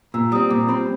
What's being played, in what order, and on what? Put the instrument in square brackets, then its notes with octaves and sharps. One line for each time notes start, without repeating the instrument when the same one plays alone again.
[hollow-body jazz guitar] A#2 [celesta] E6
[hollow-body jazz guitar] G3 C4 [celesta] D#6
[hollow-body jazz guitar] A#2 [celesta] D6
[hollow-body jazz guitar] G3 C4 [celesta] B5